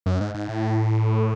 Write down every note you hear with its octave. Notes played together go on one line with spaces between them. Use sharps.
F#2
G#2
G#2
A2